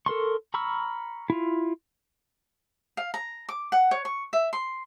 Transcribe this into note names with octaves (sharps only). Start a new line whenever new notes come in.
A4 A#4 C6 C#6
A#5 B5 C#6 E6 F6
E4 F4
F5
A#5
D6
F#5
C#5
C#6
E5
C6